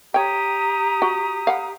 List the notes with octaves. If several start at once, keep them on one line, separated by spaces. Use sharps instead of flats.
G4 C#5 G5 A#5 D#6
F#4
F5 F#5 B5